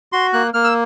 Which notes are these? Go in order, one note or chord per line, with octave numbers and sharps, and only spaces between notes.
F#4 C6
A#3 F#6
A#3 F6
E6